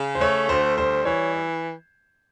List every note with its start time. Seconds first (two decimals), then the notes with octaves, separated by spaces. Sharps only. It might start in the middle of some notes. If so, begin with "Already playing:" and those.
Already playing: C#3
0.15 C5
0.21 A3 C#5
0.49 D2 C5
0.78 G3 C5
1.05 E3 C#5